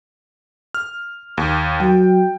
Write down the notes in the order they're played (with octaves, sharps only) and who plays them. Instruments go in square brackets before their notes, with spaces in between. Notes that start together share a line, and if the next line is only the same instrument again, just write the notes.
[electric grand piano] F6
D#2
[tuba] F#3 [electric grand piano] G5